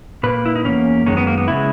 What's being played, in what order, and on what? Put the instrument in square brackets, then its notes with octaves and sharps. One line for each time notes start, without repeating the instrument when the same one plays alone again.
[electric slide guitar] A#2 A#3 B4
E4
D#4
E2 B2 A#3 C#4
F#2 D#3 G#3 C#4
B3
A#3
B3
C#3 G#3 E4